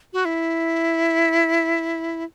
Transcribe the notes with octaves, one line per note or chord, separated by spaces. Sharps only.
F#4
E4